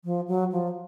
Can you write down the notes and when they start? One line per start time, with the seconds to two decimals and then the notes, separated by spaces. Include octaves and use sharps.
0.05 F3
0.28 F#3
0.52 F3